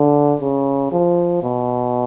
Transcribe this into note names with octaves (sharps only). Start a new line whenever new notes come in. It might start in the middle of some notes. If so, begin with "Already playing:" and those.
Already playing: D3
C#3
F3
B2